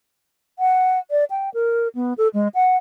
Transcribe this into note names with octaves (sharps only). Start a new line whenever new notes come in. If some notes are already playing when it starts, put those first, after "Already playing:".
F#5
D5
G5
A#4
B3
A4
G#3
F#5